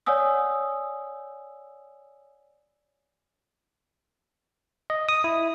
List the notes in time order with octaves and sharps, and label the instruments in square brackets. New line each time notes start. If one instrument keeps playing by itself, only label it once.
[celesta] C#5 D5 F#5 G#5 D#6 E6
[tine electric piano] D#5
D#6
E4